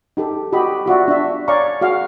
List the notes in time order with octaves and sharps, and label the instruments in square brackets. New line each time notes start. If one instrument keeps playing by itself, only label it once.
[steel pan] D#4 G4 A4
F#4 G4 D#5 B5
F4 F#4 D5 E5
D4 E5
C#5 D5 F5 G#5 A#5 C#6
F#4 G#4 F5 F#5